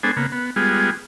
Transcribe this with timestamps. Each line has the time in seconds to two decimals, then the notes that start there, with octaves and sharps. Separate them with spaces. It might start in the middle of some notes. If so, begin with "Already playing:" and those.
0.03 G#3 B3 D4 A4 C5 G#5
0.17 C#3 A#3 B3
0.32 B3
0.56 G3 G#3 B3 F4 G#4